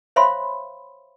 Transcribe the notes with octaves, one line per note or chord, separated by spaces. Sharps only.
C5 C#5 E5 F5 B5 C6